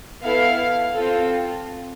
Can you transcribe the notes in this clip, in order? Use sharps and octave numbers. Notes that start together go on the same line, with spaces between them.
B3 E4 A4 F5
C4 F4 A4